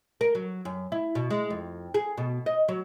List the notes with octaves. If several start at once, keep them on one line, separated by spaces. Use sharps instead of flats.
A#4
F#3
F#2
E4
B2
G#3
F2
G#4
B2
D#5
F#3